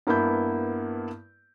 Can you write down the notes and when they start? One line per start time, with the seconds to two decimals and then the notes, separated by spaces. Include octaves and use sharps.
0.07 G2 A#3 B3 E4 B5 G6